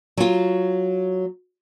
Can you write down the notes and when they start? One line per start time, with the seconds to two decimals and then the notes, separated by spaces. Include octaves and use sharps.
0.17 F#3 F4